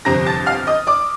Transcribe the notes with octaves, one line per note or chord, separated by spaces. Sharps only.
G1 F2 C3 G3 C4 A#5 A#6
A5 A6
F5 F6
D#5 D#6
D5 D6